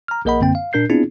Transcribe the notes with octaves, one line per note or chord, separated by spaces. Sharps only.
A#5 F6
A#1 A#3 A#4 D#5 F#5 B5
F#2 D3 A#3 C4 G5
F5
A#2 D4 A#4 G6 C7
B3 C4 D4 E4 F4 G#4